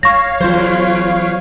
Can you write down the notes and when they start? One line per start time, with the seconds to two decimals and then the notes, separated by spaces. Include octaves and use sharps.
0.03 C#5 F5 C#6 A#6
0.41 E2 F#3 F4 C5